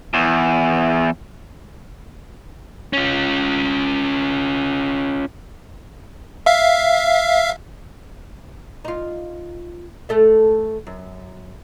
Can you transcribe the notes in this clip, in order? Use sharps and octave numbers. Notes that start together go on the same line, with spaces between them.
E2
C#4 F4
E5 F5
D#4 F4
A3 A4 E5
F#2